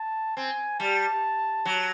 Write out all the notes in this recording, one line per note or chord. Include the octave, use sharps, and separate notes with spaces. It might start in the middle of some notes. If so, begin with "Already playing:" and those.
Already playing: A5
C4 G#5
G3 A5
F#3